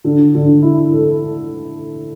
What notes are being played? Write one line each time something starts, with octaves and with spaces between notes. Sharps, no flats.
D3
D3
E4
A4